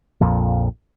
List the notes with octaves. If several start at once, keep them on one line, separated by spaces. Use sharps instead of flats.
A#1 F2 A#2 F3